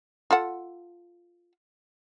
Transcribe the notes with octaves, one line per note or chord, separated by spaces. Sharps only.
F4 A4 F#5